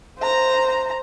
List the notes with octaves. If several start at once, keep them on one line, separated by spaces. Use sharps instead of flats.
C5 A#5